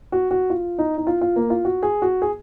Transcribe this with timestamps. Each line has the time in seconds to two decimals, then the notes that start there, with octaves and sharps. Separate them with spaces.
0.12 F#4
0.31 F#4
0.50 F4
0.78 D#4
0.97 D#4
1.07 F4
1.21 F4
1.36 A#3
1.50 F4
1.65 F#4
1.83 G#4
2.02 F#4
2.22 G#4